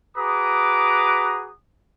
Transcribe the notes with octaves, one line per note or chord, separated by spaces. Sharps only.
F#4 G#4 B4 A#5 D6 D#6